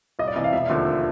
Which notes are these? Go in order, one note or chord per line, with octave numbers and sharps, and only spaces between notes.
C2 D#5
D5
C3 E3 D#5
F5
E1 E5
D#2 D3 F3 A3